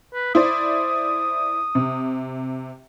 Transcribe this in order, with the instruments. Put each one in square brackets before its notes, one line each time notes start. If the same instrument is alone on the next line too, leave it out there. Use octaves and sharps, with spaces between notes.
[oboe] B4
[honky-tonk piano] E4 C5 D5 [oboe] D#6
[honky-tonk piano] C3